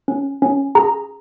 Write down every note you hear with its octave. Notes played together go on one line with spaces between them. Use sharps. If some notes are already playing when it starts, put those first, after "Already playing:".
C#4
C#4
G#4 A#5